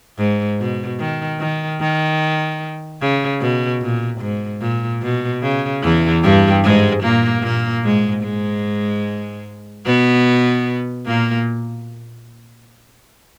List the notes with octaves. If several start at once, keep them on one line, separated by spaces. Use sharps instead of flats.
G#2
B2
D#3
D#3
D#3
C#3
B2
A#2
G#2
A#2
B2
C#3
E2 E3
G2 G3
G#2 G#3
A#2 A#3
A#2 A#3
G#2 G#3
G#2 G#3
B2 B3
A#2 A#3